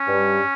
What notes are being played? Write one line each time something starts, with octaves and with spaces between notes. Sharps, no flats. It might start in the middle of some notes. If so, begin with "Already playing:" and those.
Already playing: C#4
G2 G3